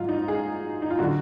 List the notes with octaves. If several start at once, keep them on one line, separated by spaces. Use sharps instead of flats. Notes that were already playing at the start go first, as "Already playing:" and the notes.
Already playing: G#2 F#3 F4
D#4
G#4
D#4
F4
D3 F#3 F#4